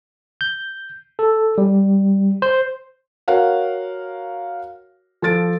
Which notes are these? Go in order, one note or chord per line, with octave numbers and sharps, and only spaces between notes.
G6
A4
G3
C5
F#4 A#4 C#5 F5 F#5
F3 A4 A6 D7